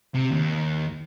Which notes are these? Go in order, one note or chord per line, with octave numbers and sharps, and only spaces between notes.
C3
D#2